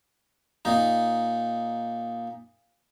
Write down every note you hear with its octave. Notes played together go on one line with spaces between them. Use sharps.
A#2 D#4